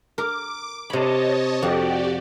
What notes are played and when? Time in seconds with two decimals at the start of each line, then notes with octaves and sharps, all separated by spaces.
0.18 A#4 D6
0.90 C3 C#5 D#5 A5 B5
1.62 F2 F#4 G4 D5